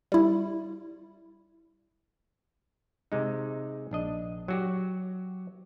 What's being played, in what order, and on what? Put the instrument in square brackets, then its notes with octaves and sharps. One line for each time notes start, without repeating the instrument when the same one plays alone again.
[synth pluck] G3 E4
[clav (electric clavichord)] C3 G#3 D#4
A#1 D4 D#5
F#3 F#4 G4